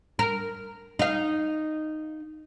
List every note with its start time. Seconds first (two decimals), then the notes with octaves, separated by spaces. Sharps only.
0.19 A#4
0.99 D#4 F5